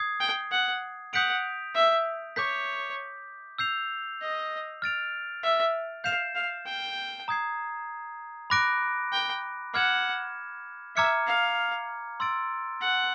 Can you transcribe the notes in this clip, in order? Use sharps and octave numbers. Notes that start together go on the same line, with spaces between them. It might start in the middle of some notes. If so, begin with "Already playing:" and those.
Already playing: D#6 G#6 C7
G5
F#5
F#5 D#6 G6 B6 D7 F7
E5
C#5 D6 G6 B6
E6 G6 C7 F7
D#5
F6 A6 D7 F7
E5
F5 G6 C7 E7
F5
G5
A#5 D#6 G#6 C7
B5 D6 F#6 A#6 D7
G5
F#5 D6 F6 G#6 C#7 E7
E5 A#5 D6 F6 G#6 C#7
F5
C6 E6 A6 D7
F#5